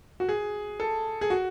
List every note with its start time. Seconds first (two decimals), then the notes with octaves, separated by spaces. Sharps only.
0.20 F#4
0.29 G#4
0.80 A4
1.21 G#4
1.30 F#4